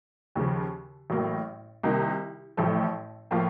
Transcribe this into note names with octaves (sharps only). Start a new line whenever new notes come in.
D#2 C#3 F3
A1 A2 F#3 A#3
C2 C3 D#3 A#3 D#4
A1 A2 F3 A3
A2 F3 A#3 F4